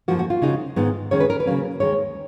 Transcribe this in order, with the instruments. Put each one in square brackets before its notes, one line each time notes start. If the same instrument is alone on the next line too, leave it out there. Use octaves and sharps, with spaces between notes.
[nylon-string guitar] F#2 F3 A#3 F#4
F#4
F4
C#3 G#3 D#4
G#2 D#3 G#3 B3 D#4
F#2 D#3 G#3 C#4 C#5
B4
A#4
B4
C#3 F#3 A#3 C#4
D#2 D#3 G#3 C#5